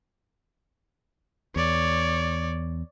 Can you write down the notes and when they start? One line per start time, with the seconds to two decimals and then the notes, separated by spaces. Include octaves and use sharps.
1.56 E2 C#5 D5